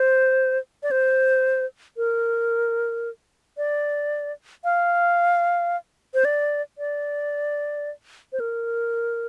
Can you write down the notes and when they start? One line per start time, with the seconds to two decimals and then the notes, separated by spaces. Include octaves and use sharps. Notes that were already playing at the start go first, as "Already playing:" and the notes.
Already playing: C5
0.83 D5
0.91 C5
1.97 A#4
3.57 D5
4.64 F5
6.14 C5
6.25 D5
6.78 D5
8.33 C5
8.40 A#4